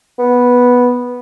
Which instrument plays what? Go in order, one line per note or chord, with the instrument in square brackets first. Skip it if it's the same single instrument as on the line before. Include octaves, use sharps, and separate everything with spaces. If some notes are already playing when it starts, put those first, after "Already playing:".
[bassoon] B3